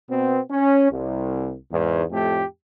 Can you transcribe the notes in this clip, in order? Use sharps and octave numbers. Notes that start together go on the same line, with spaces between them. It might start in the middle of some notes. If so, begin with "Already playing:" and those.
B2 B3 C4
C#4
C2
E2 G#2
F2 A2 A3 G4